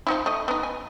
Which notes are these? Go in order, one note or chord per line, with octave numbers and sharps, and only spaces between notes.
F3 D#4 E4
A3 D#5
B3 D#4
G#5